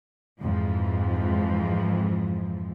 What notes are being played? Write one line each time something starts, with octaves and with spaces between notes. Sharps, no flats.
F2 G#2 E3 F3